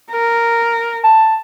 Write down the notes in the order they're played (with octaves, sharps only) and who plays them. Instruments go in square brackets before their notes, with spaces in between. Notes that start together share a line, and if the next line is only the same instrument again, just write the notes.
[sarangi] A#4
[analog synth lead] A5